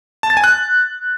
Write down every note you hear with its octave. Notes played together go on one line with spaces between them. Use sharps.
A5
A6
G#5
F#6